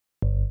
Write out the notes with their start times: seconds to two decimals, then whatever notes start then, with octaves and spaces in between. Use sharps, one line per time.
0.22 G1